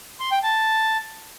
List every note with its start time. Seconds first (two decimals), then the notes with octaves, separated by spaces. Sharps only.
0.20 C6
0.32 G5
0.43 A5